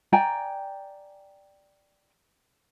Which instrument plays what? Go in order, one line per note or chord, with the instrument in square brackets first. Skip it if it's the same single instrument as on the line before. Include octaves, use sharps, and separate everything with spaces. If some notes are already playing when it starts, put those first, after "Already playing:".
[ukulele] D5 G5 G#5 A#5